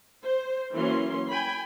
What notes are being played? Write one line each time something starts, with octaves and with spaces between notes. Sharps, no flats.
C5
E3 F#3 A#3 C#4 C6
G5 G#5 B5